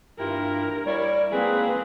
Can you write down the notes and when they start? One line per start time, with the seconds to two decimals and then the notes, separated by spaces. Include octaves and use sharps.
0.19 G2 E4 F4 G4 A#4
0.86 G3 E4 C#5 D5
1.32 G#3 A#3 C4 G#4 B4